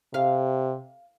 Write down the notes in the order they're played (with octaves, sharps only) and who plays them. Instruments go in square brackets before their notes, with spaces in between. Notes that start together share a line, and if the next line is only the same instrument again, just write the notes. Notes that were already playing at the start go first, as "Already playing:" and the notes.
[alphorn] C3 [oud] F5